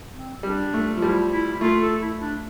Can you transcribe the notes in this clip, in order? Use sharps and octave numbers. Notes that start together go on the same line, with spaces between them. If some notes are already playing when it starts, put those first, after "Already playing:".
C4
G3 D4
A3
F3
G3 E4
E4
A3 F4
A4
E4
D4